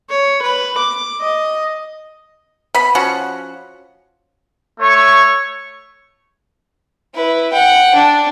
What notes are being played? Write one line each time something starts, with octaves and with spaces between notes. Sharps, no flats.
C#5
B4
D6
D#5
B3 B5
F3 C#4 F#4 F#5
A3 C#5 C#6
E4 B4
F#5 G5
D4